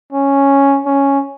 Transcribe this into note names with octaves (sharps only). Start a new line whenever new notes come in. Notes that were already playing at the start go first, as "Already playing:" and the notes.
C#4
C#4